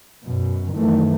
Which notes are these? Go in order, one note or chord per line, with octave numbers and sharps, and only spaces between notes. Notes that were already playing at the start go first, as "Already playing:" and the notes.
F#2 B2
F#2 D#3 E3 A3